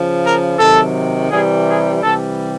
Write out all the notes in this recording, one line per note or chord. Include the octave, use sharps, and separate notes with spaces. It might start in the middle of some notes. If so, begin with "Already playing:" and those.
Already playing: C#3 F3
A#4
C3 D#3 F#3 A4
C3 E3 G3 G#4
G#4
C3 E3 G3 A4